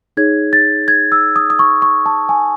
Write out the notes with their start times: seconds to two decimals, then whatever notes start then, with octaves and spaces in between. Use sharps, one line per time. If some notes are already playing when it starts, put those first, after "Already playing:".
0.17 D#4 G#4 C#5 G#6
0.53 A6
0.88 G#6
1.12 E6
1.36 D#6
1.50 D#6
1.59 C#6
1.82 C#6
2.06 A5
2.29 G#5